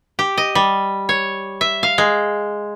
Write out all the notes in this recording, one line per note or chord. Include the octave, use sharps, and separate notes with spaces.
G4
D#5
G3
C#5
E5
F5
G#3